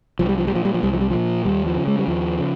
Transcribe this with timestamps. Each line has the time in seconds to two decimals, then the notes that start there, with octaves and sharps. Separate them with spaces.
0.19 C2 F3
0.29 G3
0.38 F3
0.48 G3
0.51 A#2 F3
0.65 G3
0.74 F3
0.83 C2 G3
0.93 F3
1.01 G3
1.10 A#2 F3
1.45 D#2 G3
1.66 F3
1.77 C#3
1.87 G#3
1.99 G3
2.08 D#2 F3
2.39 C#3